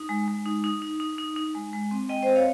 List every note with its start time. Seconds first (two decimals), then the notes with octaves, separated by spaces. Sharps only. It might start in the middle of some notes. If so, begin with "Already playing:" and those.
Already playing: D#4
0.09 G#3
0.28 G#3
0.46 D#4
0.64 D#4
0.82 D#4
1.00 D#4
1.18 D#4
1.36 D#4
1.55 G#3
1.73 G#3
1.91 C4
2.09 G#3 D#5 G5
2.22 C4 C5 D#5
2.36 C#5 F5